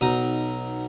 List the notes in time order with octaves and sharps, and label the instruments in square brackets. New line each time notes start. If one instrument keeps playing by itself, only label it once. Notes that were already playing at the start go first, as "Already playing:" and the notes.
[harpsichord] B1 D#4 D#6